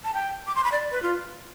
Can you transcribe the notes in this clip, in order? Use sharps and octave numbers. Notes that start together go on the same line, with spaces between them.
A5
G5
D6
C6
B5
D5
B4
F4